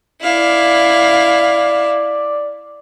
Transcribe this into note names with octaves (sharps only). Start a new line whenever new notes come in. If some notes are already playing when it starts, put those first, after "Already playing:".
E4 D5 F5